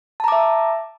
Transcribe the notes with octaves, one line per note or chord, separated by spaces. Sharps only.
E5 A5 A#5 D6